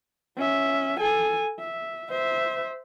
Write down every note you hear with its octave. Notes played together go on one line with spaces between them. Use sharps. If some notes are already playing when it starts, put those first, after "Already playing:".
C#4 E5
A4 G#5
E5
C5 E5